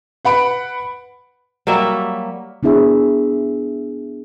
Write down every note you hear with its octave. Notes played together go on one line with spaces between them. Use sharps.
B4 F#5 B5 D7
F#3 G3 A#3 E5
B3 D4 E4 G#4 E5